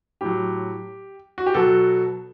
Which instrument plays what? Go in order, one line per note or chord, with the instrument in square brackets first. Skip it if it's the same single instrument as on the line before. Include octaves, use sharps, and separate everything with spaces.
[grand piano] A2 F#3 G4
F#4
G4
B2 F#3 F#4 A4